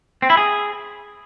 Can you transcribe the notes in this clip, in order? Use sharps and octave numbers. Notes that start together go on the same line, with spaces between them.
C4
E4
G#4